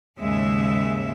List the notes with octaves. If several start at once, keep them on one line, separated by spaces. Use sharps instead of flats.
D#2 G#2 C#3 G#3 E5